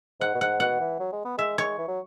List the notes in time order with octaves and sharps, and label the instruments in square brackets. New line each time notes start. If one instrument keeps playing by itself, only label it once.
[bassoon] G#2 [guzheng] F#5
[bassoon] B2
[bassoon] G#2 [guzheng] F#5
[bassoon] B2 [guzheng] F#5
[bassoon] E3
F#3
G#3
B3
[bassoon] G#3 [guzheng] E5
[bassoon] G#3 [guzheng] C#5
[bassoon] E3
F#3